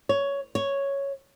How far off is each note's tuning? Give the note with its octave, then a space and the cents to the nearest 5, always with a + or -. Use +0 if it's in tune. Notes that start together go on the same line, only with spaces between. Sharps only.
C#5 +10
C#5 +0